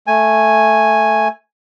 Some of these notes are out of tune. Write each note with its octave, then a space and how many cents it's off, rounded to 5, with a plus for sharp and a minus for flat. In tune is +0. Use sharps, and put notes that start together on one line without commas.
A3 +0 G#5 +0